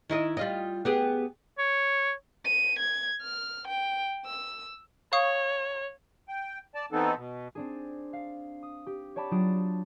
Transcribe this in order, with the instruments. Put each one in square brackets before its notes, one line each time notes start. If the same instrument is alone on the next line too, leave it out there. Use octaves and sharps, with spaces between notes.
[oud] D#3 E4 D#5
G3 F4 D#5
B3 G4 G#4
[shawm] C#5
[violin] D#7
G#6
F6
G5
E6
[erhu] C#5 [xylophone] F5 C#6 D#6
[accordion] G5
D5 A5
E3 B3 C4 D#4 A4
B2
[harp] C4 D4 G#4
F5
D#6
G4
C#5 D5 G5 A5 B5 D6
F#3 D4 F4 D#6 G6 D7